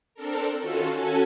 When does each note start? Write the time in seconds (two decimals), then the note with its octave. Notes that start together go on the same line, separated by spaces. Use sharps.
0.14 C4 D4 A4 A#4
0.59 D#3 C#4 F4 F#4 A4
0.94 C#4 F#4 A4 G#5 A5